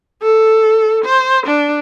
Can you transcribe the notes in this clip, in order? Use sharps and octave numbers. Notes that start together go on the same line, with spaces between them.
A4
C5
D4